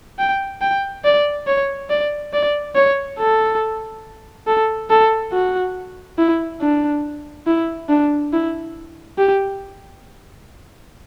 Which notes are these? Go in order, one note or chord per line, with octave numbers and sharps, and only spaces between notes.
G5
G5
D5
C#5
D5
D5
C#5
A4
A4
A4
F#4
E4
D4
E4
D4
E4
G4